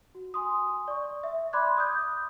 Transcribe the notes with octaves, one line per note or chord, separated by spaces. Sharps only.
F#4
G#5 C6 D#6
D5 C#6
E5
D5 B5 C6 D6 F#6 G#6
D#6 G6